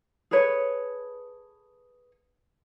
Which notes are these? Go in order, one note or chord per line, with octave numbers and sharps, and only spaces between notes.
G#4 A4 B4 C#5